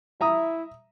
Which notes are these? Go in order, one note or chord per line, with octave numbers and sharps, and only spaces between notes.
E4 E5 A#5 D#6